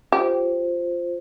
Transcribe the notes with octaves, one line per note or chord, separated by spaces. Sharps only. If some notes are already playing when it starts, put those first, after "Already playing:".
F4 G4 C5